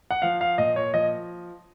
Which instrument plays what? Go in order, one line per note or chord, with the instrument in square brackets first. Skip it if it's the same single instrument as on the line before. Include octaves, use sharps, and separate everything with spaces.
[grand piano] F#5
F3 F5
F5
A#2 D#5
C#5
F3 D#5